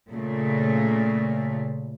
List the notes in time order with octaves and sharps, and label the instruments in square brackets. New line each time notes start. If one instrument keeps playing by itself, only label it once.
[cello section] A#2 C#3 A3